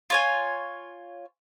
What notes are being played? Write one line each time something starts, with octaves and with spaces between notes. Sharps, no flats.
F4 C#5 G#5